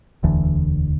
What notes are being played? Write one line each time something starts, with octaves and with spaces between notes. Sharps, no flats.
E1 D2 D3 E3